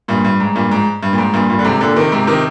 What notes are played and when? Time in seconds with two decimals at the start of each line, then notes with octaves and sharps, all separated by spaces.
0.08 G2 A#2
0.25 G2
0.40 G#2
0.55 G2 A#2
0.71 G#2
1.03 G2
1.13 A#2
1.18 G#2
1.34 G2 A#2
1.50 G2 A#2
1.59 D3
1.65 G#2 C3
1.81 A#2 D3
1.96 C3 D#3
2.12 G#2 C3
2.27 C3 D#3